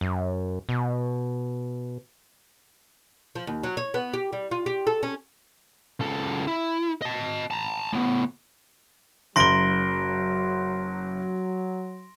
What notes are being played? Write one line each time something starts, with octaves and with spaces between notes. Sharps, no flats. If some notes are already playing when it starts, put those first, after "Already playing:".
F#2
B2
F3
D#2
F#3
C#5
B3
G4
G3
F4
G4
A4
C#4
C#2 A4
E4
D#5 A5
A5 A#5
A2 B3
F#1 F#3 C6 A#6 D7 G7